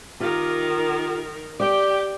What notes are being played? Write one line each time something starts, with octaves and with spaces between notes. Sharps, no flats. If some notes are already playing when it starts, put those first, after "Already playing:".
D#3 F4 G4 A#4
G4 D5 G5